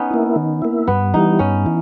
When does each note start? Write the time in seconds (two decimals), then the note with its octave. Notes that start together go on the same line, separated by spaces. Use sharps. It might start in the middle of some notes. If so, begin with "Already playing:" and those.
Already playing: B3 C#4 D#4
0.11 A#3 E4
0.36 D#3
0.62 A#3 E4
0.87 G2 B3
1.14 E3 G3 D#4
1.39 G2 C#4
1.66 E3